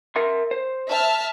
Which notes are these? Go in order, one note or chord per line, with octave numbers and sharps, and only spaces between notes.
A#4 E5 C6
C5
E5 A5 F6